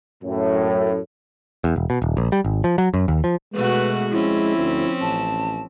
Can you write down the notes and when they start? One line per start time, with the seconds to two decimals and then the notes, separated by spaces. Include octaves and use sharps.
0.24 F#2 A2
1.64 E2
1.76 E1
1.90 B2
2.02 D#1
2.17 A#1
2.32 G3
2.44 G#1
2.64 F3
2.78 F#3
2.94 F#2
3.08 D#2
3.24 F3
3.53 B2 G#3 A3 F#4 B4
4.11 F3 C4 C#4 E4
4.58 D2
5.01 A1 A5